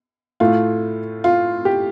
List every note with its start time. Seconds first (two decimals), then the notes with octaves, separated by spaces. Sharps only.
0.40 A2 A3 F4
1.24 F4
1.65 G4